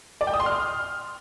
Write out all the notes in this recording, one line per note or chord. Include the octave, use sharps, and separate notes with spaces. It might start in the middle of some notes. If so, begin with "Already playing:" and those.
D5
G5
D#6
C6
F6